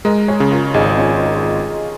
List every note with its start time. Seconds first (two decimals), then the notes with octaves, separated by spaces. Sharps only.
0.05 G#3 A#4 D#5
0.28 G#4 C#5
0.40 C#3
0.51 F4 A#4
0.74 G#1 D#4 G#4
0.97 C#4 F4